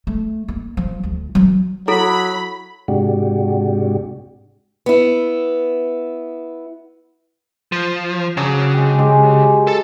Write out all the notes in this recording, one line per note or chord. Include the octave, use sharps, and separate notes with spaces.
A3
A#3
F3
D2
E3 F#3
F#3 E4 A4 A#5 B5
G#2 C3 G#3 D4 F#4 G4
B3 E4
F3
C#3 F#3 D4 F#4
G#3 G5
G#3 F#4 G4
A4 A5